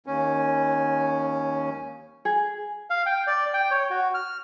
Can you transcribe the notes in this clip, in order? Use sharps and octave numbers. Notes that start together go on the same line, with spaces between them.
D#2 C#4
G#4
F5
G5
D5
G5
C#5
F#4
F6